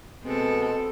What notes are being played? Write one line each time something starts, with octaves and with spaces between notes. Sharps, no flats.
B2 G#3 B3 C4 A4